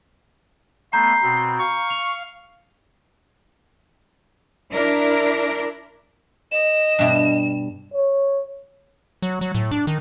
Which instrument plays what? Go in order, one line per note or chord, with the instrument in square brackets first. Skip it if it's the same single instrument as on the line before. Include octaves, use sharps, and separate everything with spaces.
[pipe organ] A3 B3 [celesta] A#5 G6 [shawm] C6
[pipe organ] B2 C4
[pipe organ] F5 [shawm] C#6
[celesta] F7
[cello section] D4 E4 A#4
[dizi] D#5 [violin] E7
[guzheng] G2 B2 G3
[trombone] C#5
[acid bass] F#3
F#3
A2
D4
D#3